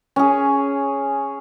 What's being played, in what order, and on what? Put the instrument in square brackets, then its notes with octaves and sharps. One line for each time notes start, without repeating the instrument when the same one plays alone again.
[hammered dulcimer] C#4 G#4